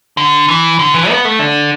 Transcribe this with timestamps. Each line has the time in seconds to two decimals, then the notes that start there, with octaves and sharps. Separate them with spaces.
0.17 D3
0.48 E3
0.79 D3
0.94 E3
1.10 B3
1.25 A3
1.39 D3